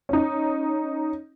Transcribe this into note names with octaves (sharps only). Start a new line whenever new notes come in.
C#4 D#4